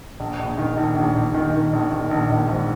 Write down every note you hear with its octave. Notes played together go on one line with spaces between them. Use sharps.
A#1
A#1
D#3
A#1
A#1
A#1
D#3
D#3
A#1
D#3
A#1
A#1
G#2